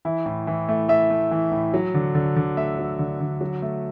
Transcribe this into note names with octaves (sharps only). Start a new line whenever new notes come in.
E3 E4
A2
E3
A3
A3 E5
A3
E3
A2
F#3
D3
D3
D3
A3 E5
F#3
D3
D3
F#3
A3